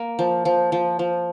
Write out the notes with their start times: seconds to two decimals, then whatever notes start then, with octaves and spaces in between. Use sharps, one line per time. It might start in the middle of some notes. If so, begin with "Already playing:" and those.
Already playing: A#3
0.19 F3
0.45 F3
0.72 F3
0.99 F3